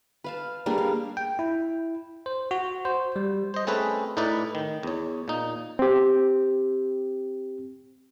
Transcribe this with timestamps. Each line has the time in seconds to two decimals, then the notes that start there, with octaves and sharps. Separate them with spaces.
0.24 B4 F5 A5
0.66 G3 A#3 D4 G#4
0.78 F5
1.17 G5
1.39 E4
2.26 C5
2.51 F#4
2.85 C5
3.16 G3
3.54 C5 D#5
3.67 A3 C4 C#4 G#4 A4 B4
4.17 A2 D#4 E4 B4 D5
4.55 D#3
4.83 E2 C#5
5.28 A#2 D#4
5.79 C4 G4